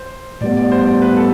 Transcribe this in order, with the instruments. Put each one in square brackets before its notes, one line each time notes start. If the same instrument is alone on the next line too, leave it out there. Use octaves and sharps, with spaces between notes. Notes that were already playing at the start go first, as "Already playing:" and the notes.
Already playing: [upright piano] C5
[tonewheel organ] A2 G3 B3 [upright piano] D5
[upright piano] D5
C5
D5
B4
A4